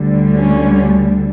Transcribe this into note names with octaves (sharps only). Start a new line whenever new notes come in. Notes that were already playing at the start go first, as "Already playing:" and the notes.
Already playing: D2 D3 G3
C#4